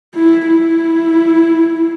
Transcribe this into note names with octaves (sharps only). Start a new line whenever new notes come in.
E4
E4